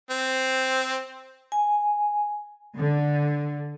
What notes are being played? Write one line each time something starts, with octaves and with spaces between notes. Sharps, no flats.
C4
G#5
D3